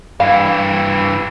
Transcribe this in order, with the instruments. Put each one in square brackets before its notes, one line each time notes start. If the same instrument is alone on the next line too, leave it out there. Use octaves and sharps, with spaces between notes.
[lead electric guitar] G2 E3 [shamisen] F5